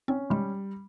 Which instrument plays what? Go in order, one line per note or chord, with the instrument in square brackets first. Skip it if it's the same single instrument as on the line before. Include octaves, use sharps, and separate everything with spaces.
[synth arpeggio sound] C4 [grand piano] C#4
[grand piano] G3 [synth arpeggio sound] G#3